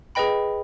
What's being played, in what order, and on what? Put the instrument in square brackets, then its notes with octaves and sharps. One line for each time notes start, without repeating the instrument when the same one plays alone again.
[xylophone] G#4 B4 D#5 G5 B5